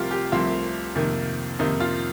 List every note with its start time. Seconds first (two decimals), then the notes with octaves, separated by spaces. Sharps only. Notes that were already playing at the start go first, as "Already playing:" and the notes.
Already playing: C2 C3 F3 A3 C4 F4 G4 A#4
0.11 G4
0.32 C2 C3 F3 A3 C4 F4
0.95 F2 C3 D#3 A#3
1.59 F2 C3 D#3 A#3 D#4
1.80 F4